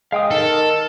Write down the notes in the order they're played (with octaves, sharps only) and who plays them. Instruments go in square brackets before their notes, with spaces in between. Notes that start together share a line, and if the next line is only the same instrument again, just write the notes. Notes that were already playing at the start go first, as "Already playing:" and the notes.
[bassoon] G#3 [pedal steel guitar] F5 G5 D#6
[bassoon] D#3 [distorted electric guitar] A4 [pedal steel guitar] A#4